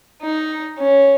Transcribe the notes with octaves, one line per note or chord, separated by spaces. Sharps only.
D#4
C#4